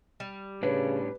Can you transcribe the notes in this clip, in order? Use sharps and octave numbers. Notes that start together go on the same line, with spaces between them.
G3
A2 C#3 C#4 D4 B4